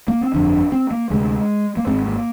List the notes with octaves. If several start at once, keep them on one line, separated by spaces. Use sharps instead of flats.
A#3
C4
G1 F2 D3 D4
C4
A#3
D2 C3 G#3
A#3
G#1 G#2 C4
A#3